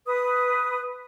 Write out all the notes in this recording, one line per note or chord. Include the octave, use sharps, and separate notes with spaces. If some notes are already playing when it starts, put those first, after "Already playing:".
B4 D#6